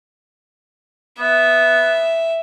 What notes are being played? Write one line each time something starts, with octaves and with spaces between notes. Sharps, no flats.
B3 E5